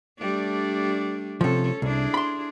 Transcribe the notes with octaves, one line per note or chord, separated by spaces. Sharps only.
G3 A3 D4
C3 F3 C#4 A4
C2 D4 E4 G#4
B5 C6